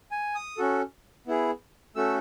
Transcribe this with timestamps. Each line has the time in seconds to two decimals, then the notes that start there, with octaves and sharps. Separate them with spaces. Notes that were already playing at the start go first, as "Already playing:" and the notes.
0.11 G#5
0.35 D#6
0.57 C#4 F#4 A4
1.27 B3 E4 G#4
1.96 A3 C#4 F#4 A4 E6